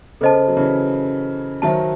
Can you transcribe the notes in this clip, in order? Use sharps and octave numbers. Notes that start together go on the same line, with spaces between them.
C#3 A4 C5 D#5 A5
F#3
C#3 E3
D#3 F#3 C5 E5 A5